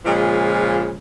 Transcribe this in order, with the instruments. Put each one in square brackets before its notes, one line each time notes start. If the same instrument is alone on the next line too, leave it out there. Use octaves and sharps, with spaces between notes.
[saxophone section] A#2 C#3 F3 G#3